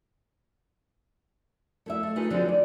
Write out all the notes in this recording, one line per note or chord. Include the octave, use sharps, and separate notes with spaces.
A3 E4 E5
A3
A3 D#4 F4 G#4 A4 B4
D3 F3 F#3 G#3 C4 D#4
D#3 D5